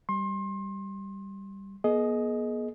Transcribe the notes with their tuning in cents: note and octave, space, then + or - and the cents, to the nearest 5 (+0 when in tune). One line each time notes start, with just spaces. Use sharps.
G3 +0 C6 +30
B3 -40 G#4 +30 D#5 +0